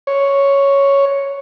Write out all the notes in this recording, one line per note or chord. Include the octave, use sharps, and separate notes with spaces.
C#5